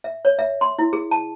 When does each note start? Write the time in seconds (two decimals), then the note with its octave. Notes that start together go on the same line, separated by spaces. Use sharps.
0.04 E5
0.25 C#5
0.39 E5
0.61 C6
0.79 E4
0.93 G#4
1.11 A5